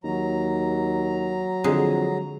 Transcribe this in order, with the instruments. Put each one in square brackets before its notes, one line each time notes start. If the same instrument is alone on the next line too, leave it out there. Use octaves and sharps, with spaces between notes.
[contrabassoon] D#2 [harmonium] F#3 A#5
[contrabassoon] F2 [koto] D3 G#3